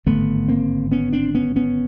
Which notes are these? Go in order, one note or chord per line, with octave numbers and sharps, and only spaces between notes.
G#1 G2 D3 A3 B3
A#3 C4
B3 C#4
C4 D4
B3 C#4
B3 C#4